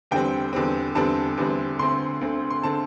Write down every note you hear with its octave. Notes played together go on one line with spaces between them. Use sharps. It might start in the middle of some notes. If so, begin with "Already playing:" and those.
E2 D3 G3 C4 G5
E2 D3 G3 C4
E2 D3 G3 C4 A5
E2 D3 G3 C4
D2 D3 C4 C6
D2 D3 C4
C6
D3 C4 A5